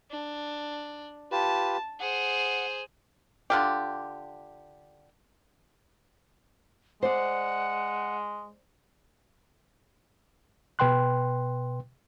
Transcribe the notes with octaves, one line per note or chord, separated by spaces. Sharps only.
D4
F4 G4 B4 A5
G#4 C5 F#5
D3 F4 G4
G#3 C5 D5 F#5
B2 B4 G5 C6 F#6